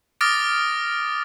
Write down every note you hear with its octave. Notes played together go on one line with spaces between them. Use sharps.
D6 D#6 F6 A6 A#6 D7